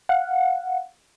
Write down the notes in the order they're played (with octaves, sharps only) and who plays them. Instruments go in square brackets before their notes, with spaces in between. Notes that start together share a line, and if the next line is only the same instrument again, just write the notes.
[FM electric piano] F5 F#5